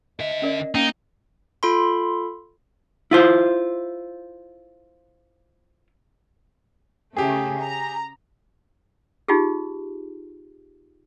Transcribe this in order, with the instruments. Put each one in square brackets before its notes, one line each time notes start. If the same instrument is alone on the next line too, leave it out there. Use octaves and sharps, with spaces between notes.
[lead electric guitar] D3 E5 [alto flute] D#5
[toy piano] C#4 A#4 D5
[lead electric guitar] A#3 [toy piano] C#4 G5 [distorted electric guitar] D#4
[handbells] F4 A4 B5 C6
[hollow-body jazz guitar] E4 F4 C5
[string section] C#3 A3 [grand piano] G4 G#4
[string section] A#5
[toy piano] D#4 F4 G4 G#4